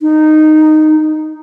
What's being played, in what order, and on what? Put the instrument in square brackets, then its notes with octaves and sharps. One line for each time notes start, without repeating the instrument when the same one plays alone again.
[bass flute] D#4